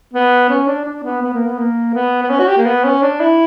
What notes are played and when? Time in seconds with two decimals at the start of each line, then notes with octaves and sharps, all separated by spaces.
0.13 B3
0.49 C#4
0.67 D4
0.85 D4
1.03 B3
1.22 B3
1.34 A#3
1.46 B3
1.58 A#3
1.94 B3
2.23 B3
2.30 C#4
2.39 F#4
2.48 G4
2.57 A#3
2.66 B3
2.84 C#4
3.03 D4
3.20 E4